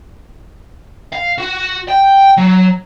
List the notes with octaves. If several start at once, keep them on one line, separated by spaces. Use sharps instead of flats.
F5
F#4
G5
F#3